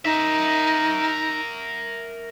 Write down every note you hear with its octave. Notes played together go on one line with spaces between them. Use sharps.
D#4 A#4 E5